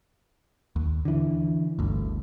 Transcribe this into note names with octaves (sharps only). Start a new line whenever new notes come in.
D#2
D3 E3
G1 D2